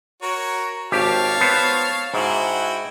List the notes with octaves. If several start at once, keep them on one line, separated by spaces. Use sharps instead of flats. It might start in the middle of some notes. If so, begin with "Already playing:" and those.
F#4 A#4 C#5
G#1 G4 C#5 F5 A5
B3 C5
G#2 E4 F#4 G5